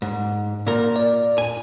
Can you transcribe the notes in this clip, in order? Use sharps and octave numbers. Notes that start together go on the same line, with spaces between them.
G#2
A#2 A#4
D5
G#5